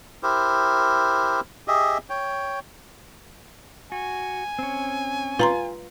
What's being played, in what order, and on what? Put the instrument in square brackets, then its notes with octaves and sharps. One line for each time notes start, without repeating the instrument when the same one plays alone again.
[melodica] E4 G4 A#4 C5
G4 G#4 D#5 E5
C#5 G5
[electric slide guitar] F#4 [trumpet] G#5
[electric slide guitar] C4 C#4
[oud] F4 [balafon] B4 A#5 C6